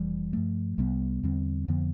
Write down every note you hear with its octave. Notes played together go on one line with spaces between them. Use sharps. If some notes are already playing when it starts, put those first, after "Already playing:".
Already playing: F1 F2 E3 G3
G2 F3 A3
C2 C3 G3 B3
E2 D3 G3 C4
F2 D3 F3 B3